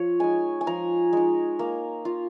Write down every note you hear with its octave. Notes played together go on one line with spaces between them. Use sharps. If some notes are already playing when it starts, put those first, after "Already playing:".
Already playing: F3 C#5
G#3 D#4 G#5
G#5
F3 A#5
G#3 D#4
A#3
F4